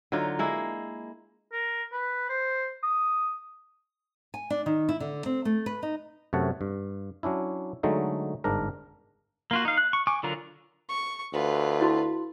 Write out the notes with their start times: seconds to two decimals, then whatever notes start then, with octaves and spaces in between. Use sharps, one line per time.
0.12 D3 F#3 D#4 F4
0.39 G#3 A#3 E4
1.52 A#4
1.92 B4
2.29 C5
2.83 D#6
4.34 G#5
4.50 D4
4.66 D#3
4.89 E4
5.00 D3
5.26 C4
5.45 A3
5.66 B4
5.83 D#4
6.33 F#2 C3 A3 C#5 F#5 A5
6.61 G2
7.23 F#3 C#4 D4 E4
7.83 D3 F#3 G#3 A3 D#4
8.44 G1 G#2 D4 A#4
9.51 A#3 F4 F#4
9.65 D#4 F5
9.78 F#6
9.93 C#6
10.07 G#5 C#6 D6
10.23 D3 F#3 F4 A#4 A#5
10.89 C#6
11.33 D2 F4 B4
11.81 E4 F#4 C6